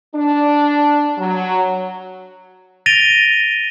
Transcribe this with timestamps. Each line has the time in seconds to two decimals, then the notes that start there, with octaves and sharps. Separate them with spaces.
0.15 D4
1.18 F#3
2.86 A6 A#6 D7 D#7 F7 G7